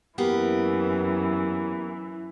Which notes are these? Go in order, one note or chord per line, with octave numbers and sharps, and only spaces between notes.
F#2 E3 A#3 B3 G4